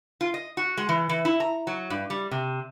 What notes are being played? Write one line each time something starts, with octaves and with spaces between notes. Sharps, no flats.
F4
D#5
F#4
G#3
E3
E3
E4
A#5
F#3
G2
G3
C3